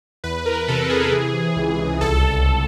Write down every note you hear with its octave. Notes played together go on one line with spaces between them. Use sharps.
E2 B4
A#4
C3 A4
G#4
E3
C#2
C2 A4
A4